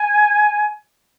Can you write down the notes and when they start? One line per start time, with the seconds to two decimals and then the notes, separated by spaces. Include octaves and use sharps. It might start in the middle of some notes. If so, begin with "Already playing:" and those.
Already playing: G#5